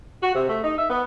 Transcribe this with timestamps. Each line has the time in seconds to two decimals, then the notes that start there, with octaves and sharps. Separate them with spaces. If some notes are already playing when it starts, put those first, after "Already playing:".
0.22 F#4
0.34 C3
0.48 A3
0.64 D#4
0.77 E5
0.90 B3